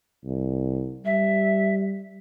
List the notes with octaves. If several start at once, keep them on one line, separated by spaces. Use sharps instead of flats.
C2
G3 E5